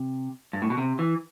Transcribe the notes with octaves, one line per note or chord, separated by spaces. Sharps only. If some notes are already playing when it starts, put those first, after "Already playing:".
Already playing: C3
G2
A2
B2
C3
E3